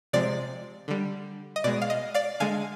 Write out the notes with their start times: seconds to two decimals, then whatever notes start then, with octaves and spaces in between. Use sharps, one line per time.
0.13 C3 F3 G#3 D5
0.88 D3 G3
1.56 D#5
1.64 B2 G#3 D5
1.81 F5
1.90 D#5
2.14 D5 F5
2.40 D3 G#3 F5 G#5